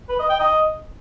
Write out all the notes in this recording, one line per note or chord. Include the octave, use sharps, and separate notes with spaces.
B4
D#5
G5
D#5